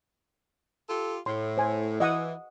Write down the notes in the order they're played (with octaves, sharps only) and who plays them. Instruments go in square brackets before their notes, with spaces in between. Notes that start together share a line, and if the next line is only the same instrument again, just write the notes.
[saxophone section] F4 G4 A4
[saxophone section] A2 [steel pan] C6
[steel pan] C5 G#5
[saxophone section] E3 [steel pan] D#5 F#5 D#6